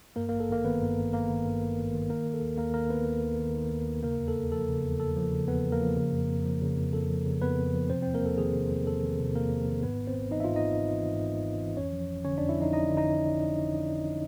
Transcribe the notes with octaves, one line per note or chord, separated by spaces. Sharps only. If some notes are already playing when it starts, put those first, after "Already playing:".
G2 A#3 A#4
G#1 A#3 A#4
A4
G#1 A#3 A#4
D#3 B3 B4
G2
G#1
G#1 A#3 A#4
D#3
G2
G#1
G#1
D#3
D#3 A#3 A#4
D#3
A4
D#2
D#2 A#3 A#4
D#3 A#3 A#4
D#3 B3 B4
D#2
D#2
D#3
D#3
D#2
D#2
C#3 A#3 A#4
E2
A4
E2
F3 A4
C#3
E2
E2 A4
F3
C#3
E2 B3 B4
E2
A#3 A#4
F3
C#3
F2
F2
F3
C#3
F2
F2 A4
F3
C#3
F2 B3 B4
F2
F3
C3 C4 C5
E2 C4 C5
A#3 A#4
E2 A4
D#3 G#4
C3
E2
E2 A4
D#3
C3
E2 A#3 A#4
E2
D#3
G#2 B3 B4
G#1
C4 C5
G#1
E3 D#4 D#5
E5
G#2 F4 F5
D#4 D#5
G#1
G#1
E3
G#2
G#1
G#1
E3
F2 C#4 C#5
F3
G1
D3 C#4 C#5
F2 D4 D5
E4 E5
F3 D#4 D#5
G1 D#4 D#5
D3
D#4 D#5